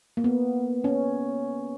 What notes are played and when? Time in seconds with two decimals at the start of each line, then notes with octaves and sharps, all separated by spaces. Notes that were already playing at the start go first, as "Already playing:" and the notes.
0.17 A#3
0.24 B3
0.84 C#4